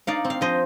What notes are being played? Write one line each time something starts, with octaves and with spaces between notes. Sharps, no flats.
D#4 D5 F5
C4
F5
F3 C5 D#5